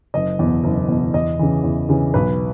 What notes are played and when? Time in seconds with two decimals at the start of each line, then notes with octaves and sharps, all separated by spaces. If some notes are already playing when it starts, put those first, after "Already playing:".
0.14 F#1 D#5
0.39 E2 B2
0.64 F#1
0.88 E2 B2
1.14 E2 D#5
1.39 C#3 E3
1.64 E2
1.89 C#3 E3
2.14 B1 B4